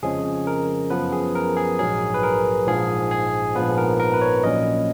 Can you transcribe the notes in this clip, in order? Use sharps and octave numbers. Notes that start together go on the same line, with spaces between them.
F2 C#3 F3 G#3 C#4 G#4
A#4
F#2 F3 B3 B4
G#4
A#4
G#4
A#1 G#2 F#3 G#4
B4
A#4
A#1 G#2 F3 G#4
G#4
A#1 G#2 F3 B3 B4
A#4
A#4
B4
C#5
A#1 A#2 F#3 C#4 D#5